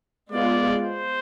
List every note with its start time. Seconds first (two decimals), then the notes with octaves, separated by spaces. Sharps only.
0.32 G#3 B3 F4 D5
0.84 C5